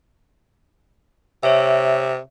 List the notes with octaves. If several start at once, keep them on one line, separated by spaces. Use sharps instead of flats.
C3 C#5 E5